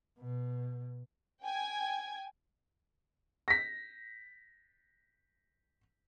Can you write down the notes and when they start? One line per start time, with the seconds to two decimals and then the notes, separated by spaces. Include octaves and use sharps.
0.20 B2
1.43 G5 G#5 G#6
3.48 A#6 B6